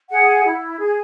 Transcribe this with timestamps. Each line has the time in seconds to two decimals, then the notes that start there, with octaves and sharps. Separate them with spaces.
0.09 G#4 F#5
0.44 E4
0.79 G#4